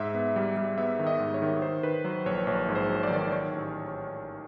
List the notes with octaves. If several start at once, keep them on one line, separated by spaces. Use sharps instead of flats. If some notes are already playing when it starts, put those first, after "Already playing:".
Already playing: G#2 E5
B3
G3
G3
B3 E5
D#3
D#5
G#2
C#5
D#3
D#3 C5
D#3 B4
F#3 C5
A#1 C#5
A#1 C#5
G#2
C5
F#3
D5
D#3
D#3 C#5
A1